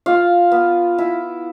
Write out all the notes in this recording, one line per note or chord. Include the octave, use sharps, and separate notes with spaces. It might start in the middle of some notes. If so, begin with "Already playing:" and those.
F4 F5
B3
E4